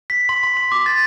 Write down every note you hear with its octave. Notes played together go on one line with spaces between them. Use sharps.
B6
C6
C6
C6
D6
A6